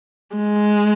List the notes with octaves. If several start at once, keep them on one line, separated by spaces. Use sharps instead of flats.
G#3